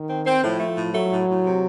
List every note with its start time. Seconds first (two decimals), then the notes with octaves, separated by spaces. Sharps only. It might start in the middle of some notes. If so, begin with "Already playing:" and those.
Already playing: D#3
0.09 C4
0.26 C4
0.43 A2 F3
0.60 A3
0.76 A2
0.93 F#3 A3
1.11 A2
1.28 A2
1.44 C3